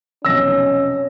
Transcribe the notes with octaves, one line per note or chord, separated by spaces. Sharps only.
F1 B1 C#4 E6 A#6